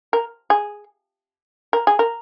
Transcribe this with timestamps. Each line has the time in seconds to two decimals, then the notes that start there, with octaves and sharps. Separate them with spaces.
0.13 A#4
0.50 G#4
1.73 A#4
1.87 G#4
1.99 A#4